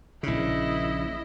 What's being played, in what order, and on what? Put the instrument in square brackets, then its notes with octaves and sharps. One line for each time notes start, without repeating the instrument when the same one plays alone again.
[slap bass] A#1 C#3 [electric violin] E4 D#5